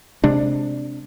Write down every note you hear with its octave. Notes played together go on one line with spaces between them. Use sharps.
C3 G#3 D4